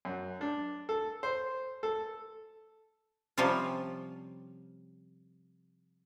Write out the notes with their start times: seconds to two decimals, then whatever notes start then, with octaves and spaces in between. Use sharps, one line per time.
0.05 F#2
0.41 D4
0.89 A4
1.23 C5
1.83 A4
3.38 C3 F3 G3 C#4 F4